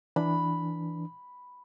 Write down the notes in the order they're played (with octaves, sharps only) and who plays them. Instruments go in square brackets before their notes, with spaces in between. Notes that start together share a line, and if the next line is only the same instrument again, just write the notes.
[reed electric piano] E3 D4 [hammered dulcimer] B5